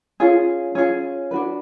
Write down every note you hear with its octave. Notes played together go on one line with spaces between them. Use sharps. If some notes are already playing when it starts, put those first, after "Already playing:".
C#4 F4 G#4
C#4 F4 G#4
D4 F#4 B4